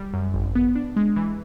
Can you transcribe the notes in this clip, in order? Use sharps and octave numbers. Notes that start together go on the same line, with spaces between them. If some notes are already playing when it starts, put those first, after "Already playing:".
Already playing: G3
F#2
G#1
B3
D4
G#3
E3